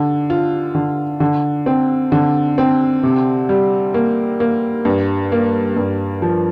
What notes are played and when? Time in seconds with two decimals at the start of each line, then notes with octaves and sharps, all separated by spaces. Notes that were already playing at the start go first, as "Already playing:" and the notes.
Already playing: D3
0.30 F4
0.75 D3
1.20 D3
1.66 C4
2.12 D3
2.58 C4
3.03 C3
3.49 G3
3.94 A#3
4.40 A#3
4.85 G2
5.32 A#3
5.76 G2
6.22 F3